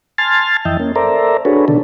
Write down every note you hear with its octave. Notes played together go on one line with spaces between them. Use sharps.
G#5 A5 C6 F6 A6
F2 E3 D#5 E5 G5
A#3 C#4
A4 A#4 C5 D5 E5 A#5
D4 F#4 G#4 A4 B4 C#5
B2 D3 D#3 D4 A4